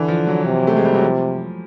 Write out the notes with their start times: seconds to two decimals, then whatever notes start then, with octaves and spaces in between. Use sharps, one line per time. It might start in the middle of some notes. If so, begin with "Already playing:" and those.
Already playing: D3 E3
0.08 F3
0.27 F#3
0.45 C3
0.67 A3
0.76 G#3
0.85 G3
0.94 F#3
1.02 F3